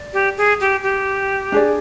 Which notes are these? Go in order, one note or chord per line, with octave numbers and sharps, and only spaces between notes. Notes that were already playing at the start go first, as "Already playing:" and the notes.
Already playing: D5
G4
G#4
G4
G4
D4 G#4 D5